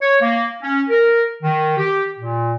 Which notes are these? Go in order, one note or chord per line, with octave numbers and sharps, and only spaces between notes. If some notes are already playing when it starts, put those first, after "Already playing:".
C#5
A#3
C#4
A#4
D#3
G4
A#2